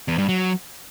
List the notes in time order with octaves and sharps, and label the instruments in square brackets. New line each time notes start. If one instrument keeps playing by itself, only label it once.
[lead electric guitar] E2
G2
F#3